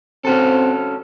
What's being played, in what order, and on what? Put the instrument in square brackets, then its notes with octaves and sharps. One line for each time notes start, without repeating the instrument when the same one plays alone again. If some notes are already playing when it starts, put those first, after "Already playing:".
[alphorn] C4 [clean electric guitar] C#4 F#4 A4